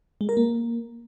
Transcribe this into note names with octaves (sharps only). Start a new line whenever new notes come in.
G#3
A#4
A#3